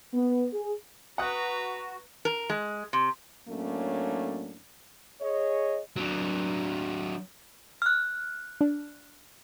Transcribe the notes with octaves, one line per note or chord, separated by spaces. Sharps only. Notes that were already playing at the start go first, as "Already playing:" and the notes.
B3
G#4
F#4 B4 F#5 A#5 D#6 F#6
A#4
G#3
C3
A2 F#3 A3 A#3 C#4 D4
G#4 C#5 D#5
F#3 D4
F6 F#6
D4